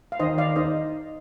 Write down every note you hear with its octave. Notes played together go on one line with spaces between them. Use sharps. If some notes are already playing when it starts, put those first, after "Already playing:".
F5
D#3 C5 D#5
D5 F5
D#4 C5 D#5